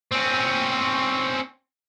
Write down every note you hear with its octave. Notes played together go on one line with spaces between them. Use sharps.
C4 C#4